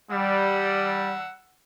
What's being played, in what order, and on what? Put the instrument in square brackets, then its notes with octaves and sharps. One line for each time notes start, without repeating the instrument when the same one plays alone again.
[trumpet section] G3 [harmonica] F#5 E6